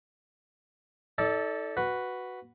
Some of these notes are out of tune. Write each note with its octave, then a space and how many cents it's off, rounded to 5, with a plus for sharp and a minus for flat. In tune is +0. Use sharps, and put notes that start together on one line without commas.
D#4 +45 A4 +0 D5 -15
F#4 +0 B4 +0